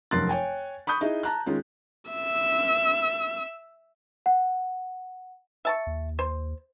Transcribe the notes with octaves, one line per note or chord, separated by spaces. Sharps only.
F1 F#2 A#4 C6 F#6 A6
C#5 G5 G#5
B5 C#6 D#6 G6
D#4 E4 G#4 D#5
A5 A#5 F#6
D#3 G#3 C#4 F4
E5 E6
F#5
E5 A5 C#6
D#2
C5